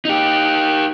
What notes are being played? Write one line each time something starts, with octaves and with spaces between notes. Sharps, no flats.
D#4 G4